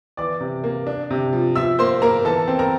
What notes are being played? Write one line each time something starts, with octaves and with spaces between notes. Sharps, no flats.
E3 D5 D6
C3
A#3
D4
C3
F3
F3 E5 E6
A#3 C5 C6
A#3 A#4 A#5
E3 A4 A5
C4
A#4 A#5